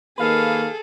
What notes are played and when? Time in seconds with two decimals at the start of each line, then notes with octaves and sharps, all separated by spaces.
0.19 D#3 A#3 G#4 A4 B4 F5